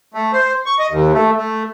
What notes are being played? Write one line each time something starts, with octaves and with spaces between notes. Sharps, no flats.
A3
C5
C#6
D#5
D#2
A3
A3